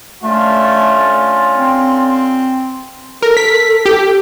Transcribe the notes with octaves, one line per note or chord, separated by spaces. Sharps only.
D3 A3 C#4 F4
C4
A4 A#4
B6
G4